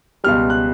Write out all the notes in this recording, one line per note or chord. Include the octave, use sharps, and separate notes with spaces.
C#2 B2 G3 F6
F#6